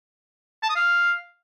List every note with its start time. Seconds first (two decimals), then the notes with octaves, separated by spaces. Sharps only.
0.63 A5
0.69 D#6
0.75 F5